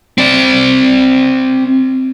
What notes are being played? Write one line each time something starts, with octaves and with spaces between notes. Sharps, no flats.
C4 D5